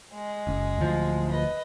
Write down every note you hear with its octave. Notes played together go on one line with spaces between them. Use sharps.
G#3
F#1
D1 F3
B4 D#5